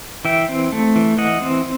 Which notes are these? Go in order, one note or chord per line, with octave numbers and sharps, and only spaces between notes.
E3 E5 G5
C4
A3
E3
E3 D#5 F#5
C4